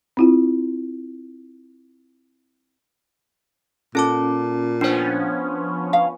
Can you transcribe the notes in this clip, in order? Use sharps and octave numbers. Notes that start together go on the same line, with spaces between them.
C4 E4 F4
A#2 C#4 A4 A5 D6
F3 B3 C#4 D4 C5
F5